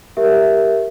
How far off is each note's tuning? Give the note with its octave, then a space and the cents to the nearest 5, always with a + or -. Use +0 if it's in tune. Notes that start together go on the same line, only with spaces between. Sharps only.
G4 +0 A#4 +0 E5 +0